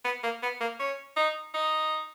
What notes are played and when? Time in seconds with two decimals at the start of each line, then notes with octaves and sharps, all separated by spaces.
0.05 B3
0.24 A#3
0.43 B3
0.61 A#3
0.79 C#4
1.17 D#4
1.54 D#4